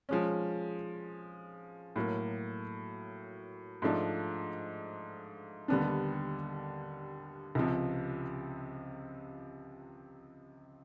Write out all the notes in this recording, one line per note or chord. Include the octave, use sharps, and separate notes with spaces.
F3 G#3 C#4
A2 F#3 A#3
G#2 F3 A3 D4
D#2 D3 G3 B3 D4
C#2 C3 F3